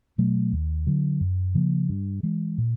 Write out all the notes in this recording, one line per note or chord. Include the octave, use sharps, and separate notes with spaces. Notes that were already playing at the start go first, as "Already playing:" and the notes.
B2 F#3 A3
D#2
D3 F#3
F#2
C#3 F3 A#3
G2
E3 G#3
A#2